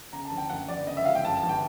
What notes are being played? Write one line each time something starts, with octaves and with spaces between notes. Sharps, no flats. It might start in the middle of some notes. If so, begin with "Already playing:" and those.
C#3 A#5
A5
D2
G5
F#2 F#5
G1 D5
C#3 D#5
E5
C#2 F5
G5
F#2 A5
A5
G1
G5